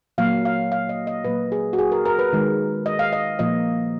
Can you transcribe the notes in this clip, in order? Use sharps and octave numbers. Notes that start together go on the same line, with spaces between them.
A#2 F#3 A#3 F5
F5
F5
D#5
D#5
A#2 F#3 A#3 B4
G#4
F#4
G#4
A#4
A#4
B4
D#3 G#3
D#5
F5
D#5
A#2 F3 A#3 D#5